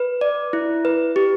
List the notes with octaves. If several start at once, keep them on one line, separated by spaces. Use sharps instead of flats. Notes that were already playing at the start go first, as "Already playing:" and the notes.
Already playing: B4
D5
E4
B4
G4